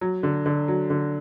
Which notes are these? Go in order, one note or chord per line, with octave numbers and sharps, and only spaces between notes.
F#3
D3
D3
F#3
D3